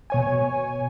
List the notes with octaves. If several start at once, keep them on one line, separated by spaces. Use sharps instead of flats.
B2 C#5 G#5